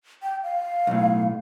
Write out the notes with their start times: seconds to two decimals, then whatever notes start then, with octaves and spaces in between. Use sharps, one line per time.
0.23 G5
0.43 F5
0.87 B1 A2